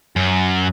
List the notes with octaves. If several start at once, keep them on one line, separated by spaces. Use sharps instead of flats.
F#2